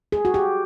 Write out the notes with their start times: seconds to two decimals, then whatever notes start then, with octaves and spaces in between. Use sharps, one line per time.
0.12 G#4
0.25 F#4
0.34 G4